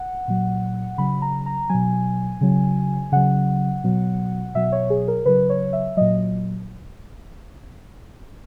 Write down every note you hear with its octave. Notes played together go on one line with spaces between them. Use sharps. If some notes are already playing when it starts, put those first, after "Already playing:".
Already playing: F#5
A#2 F#3
C#3 F#3 B5
A#5
A#5
B2 F#3 G#5
C#3 F#3
C#3 F#3 F#5
B2 F#3
B2 F#3 E5
C#5
G#4
A#4
C#3 F#3 B4
C#5
E5
A#2 F#3 D#5